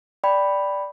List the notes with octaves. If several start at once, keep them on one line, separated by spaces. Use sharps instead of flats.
D5 G5 B5